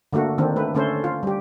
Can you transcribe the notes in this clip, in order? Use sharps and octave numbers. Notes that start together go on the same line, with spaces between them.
D3 A3 A#3 F#4
D#3 A#3 C4 D4
A3 B4
D3 A3 C#4 A4 C5
F4
G3 G4